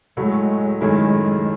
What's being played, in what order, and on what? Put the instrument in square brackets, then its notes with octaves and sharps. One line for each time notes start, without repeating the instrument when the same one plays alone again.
[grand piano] A2 F#3 A3 [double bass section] G#3
[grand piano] F#2 D#3 A3 C#4 E4 [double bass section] G#3